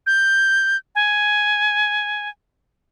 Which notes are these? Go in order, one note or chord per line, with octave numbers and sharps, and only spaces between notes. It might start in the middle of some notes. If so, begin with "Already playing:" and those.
G6
G#5